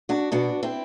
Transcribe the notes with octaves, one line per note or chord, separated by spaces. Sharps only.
D4 F#4
B2 D4 F#4
C4 E4